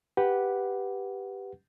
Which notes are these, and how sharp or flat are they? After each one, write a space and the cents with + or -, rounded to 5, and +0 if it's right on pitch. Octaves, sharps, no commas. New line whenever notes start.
G4 +0 B4 +0 F#5 +0